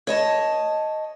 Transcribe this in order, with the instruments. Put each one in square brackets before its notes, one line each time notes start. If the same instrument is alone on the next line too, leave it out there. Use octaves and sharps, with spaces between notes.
[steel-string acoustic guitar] C#5 D#5 A5